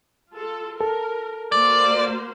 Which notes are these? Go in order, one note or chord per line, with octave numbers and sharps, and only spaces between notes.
F4 A4
A4 A#4
A#3 F#4 C5 D5